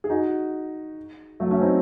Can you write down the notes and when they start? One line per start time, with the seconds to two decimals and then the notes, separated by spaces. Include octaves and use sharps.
0.04 G#4
0.10 D#4 F#4
1.40 F#3 A3
1.51 A3 C#4
1.61 C4 D#4